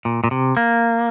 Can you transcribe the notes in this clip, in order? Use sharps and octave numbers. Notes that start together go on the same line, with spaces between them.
A#2
A#2
C3
A#3